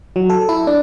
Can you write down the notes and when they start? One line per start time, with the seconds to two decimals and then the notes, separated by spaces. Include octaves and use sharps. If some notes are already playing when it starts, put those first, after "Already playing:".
0.16 F#3
0.30 A4
0.49 E4
0.67 D4